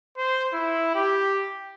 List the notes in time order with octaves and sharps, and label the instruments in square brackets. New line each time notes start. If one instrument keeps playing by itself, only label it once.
[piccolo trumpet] C5
E4
G4